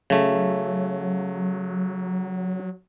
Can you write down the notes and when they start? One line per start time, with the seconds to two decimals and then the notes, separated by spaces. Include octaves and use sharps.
0.10 C#3 F#3 A3